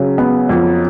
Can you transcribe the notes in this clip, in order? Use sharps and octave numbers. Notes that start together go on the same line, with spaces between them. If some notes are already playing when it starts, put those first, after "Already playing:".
Already playing: C#3 F#3
B3
F2